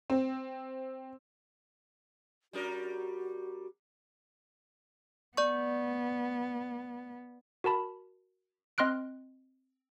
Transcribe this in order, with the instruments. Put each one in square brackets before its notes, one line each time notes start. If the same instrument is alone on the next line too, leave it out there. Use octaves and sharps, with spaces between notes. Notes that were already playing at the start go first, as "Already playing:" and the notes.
[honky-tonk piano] C4
[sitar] G3 C#4 A#4 [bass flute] F#4
[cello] B3 [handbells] D5 C#6
[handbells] F#4 A#4 A5 B5
C4 D#5 C6 F6 F#6 D7